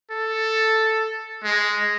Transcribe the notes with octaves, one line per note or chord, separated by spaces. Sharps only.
A4
G#3